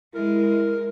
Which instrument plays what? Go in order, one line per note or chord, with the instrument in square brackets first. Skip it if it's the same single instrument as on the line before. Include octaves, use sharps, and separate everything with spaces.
[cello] G#3 [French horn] E4 [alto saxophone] A#4